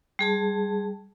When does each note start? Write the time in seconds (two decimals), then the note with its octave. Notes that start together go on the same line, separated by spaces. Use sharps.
0.19 G3 G#4 A5